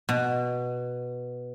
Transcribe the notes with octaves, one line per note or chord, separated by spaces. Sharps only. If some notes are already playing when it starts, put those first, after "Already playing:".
B2